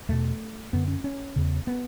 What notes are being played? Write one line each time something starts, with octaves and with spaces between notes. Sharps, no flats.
E2 B2 A3
F#2 D3 B3
C#4
C#4
E2 C#3
B3